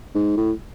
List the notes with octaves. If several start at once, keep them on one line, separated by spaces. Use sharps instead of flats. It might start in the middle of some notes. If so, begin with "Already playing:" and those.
G#2
A2